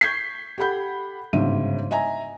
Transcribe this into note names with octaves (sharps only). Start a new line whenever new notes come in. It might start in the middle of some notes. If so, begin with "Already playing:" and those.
C#6 G6 G#6 B6 C7
G4 A4 F#5 B5 G6
G1 G#2 C#3 F#4 E5 D#7
D#5 E5 G#5 A#5